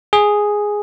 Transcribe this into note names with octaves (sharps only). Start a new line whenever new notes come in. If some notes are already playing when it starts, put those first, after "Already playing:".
G#4